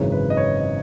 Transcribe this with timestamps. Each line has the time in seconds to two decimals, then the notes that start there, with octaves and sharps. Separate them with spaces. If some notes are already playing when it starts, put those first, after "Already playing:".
Already playing: G#1 F#2 C#3 E3 G#3 C#5
0.12 B4
0.30 D#5
0.37 C#5
0.61 D#5